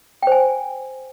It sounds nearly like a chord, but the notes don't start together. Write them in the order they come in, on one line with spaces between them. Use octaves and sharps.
G5 C5 G#5